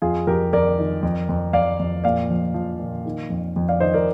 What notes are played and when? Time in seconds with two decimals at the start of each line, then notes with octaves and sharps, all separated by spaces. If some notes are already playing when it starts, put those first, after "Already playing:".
0.02 F2 F4 G#4
0.27 F2 G4 A#4
0.53 F2 A#4 D5
0.79 D#3
1.03 F2
1.29 F2
1.53 F2 D5 F5
1.80 F2
2.04 A#2 D5 F5
2.30 F3
2.54 F3
2.79 A#2
3.05 D#3
3.30 F2
3.56 F2
3.69 D5 F5
3.80 D#3 C5 D#5
3.94 A#4 D5